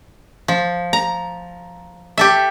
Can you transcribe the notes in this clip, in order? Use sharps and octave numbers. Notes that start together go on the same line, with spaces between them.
F3
A#5
G4 A4 E5